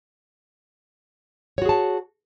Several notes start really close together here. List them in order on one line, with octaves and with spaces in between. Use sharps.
C#5 F#4 G#4 A5